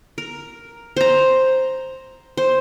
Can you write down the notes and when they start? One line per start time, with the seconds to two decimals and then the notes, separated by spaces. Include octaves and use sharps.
0.18 A#4
0.97 C5 A#5
2.37 C5